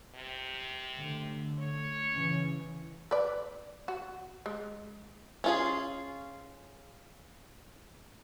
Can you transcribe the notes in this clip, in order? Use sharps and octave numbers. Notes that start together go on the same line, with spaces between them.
C3
D3 A3
C#5
C#3 E3 C#4
B4 D5
F#4
G#3
C#4 F4 G#4